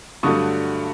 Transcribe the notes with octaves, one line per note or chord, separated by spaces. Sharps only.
G2 D3 F#3 A3 C#6 D#6